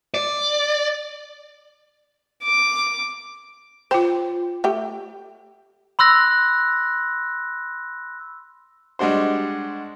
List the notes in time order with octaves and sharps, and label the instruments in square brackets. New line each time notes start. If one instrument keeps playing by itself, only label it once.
[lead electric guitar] D5
[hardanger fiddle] D6
[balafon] F4 G5 [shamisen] C5
[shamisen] A3 G4
[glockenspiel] B5 C6 E6 F#6 A#6
[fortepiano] G3 G#3 D4 F#4 C5